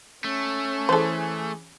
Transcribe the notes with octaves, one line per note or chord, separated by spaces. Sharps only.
A3 C#4
E3 G#4 A4 C5